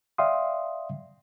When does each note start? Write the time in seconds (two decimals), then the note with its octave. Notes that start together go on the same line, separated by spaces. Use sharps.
0.18 D5 E5 F5 G5 C6 D#6